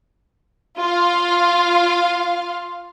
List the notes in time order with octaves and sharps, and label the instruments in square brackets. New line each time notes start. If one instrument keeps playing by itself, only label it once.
[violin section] F4 F5